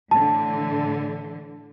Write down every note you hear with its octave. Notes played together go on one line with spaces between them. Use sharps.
A2 D3 E3 A5